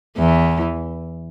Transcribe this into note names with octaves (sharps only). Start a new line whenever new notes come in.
E2 E3